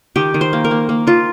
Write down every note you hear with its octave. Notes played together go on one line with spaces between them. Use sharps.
D#3 G4
D#3
C5
A#3
A#4
A#3
A#3
D#3 F4